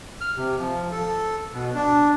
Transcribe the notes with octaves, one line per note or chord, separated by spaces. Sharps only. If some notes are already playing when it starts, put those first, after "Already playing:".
F6
C3
F3
A4
B2
D4